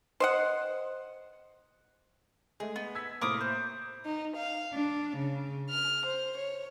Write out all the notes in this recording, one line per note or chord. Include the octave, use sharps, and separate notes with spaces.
C5 D#5 F#5
G#3 A3 G#4
B3
E6 G#6 B6
A2 C3 A#3 A#4 D6 D#6
C5
D#4
F5
D4
C#3
F6
C5
C#5